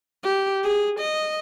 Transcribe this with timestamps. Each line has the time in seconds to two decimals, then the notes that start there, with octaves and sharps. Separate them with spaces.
0.24 G4
0.64 G#4
1.00 D#5